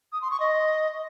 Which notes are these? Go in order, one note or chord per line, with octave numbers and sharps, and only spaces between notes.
D#6
C6
C#6
D#5